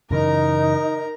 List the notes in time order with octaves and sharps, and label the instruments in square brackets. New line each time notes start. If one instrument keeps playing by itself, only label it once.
[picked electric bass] F#2 C#3 E3 [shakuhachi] D#4 [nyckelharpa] A#4 A#5